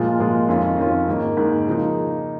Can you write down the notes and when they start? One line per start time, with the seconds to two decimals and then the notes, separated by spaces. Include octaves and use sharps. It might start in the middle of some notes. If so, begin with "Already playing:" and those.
Already playing: A#2 F3 G#3 F4
0.19 A#2 F3 G#3 F4
0.49 F2 D#3 C#4 F4
0.78 F2 D#3 C#4 F4
1.08 G#2 D#3 A#3
1.37 G#2 D#3 A#3
1.67 C#3 F3 A#3 D#4